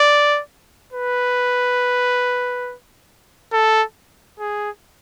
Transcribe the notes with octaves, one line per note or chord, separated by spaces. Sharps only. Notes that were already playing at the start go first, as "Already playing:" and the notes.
Already playing: D5
B4
A4
G#4